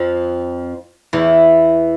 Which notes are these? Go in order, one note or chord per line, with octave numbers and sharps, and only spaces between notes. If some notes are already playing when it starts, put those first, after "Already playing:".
Already playing: F2 F3
E2 E3